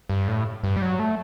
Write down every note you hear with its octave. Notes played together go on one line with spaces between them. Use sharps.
G2
A2
G2
G3
F#3
A3